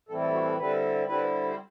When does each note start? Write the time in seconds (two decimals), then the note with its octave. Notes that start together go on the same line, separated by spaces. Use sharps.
0.09 A2 E3 G3 C4 E4 A4
0.21 A4
0.34 F#4
0.45 A4
0.58 D3 G3 C4 E4 B4
1.07 D3 G3 C4 E4 B4
1.48 C5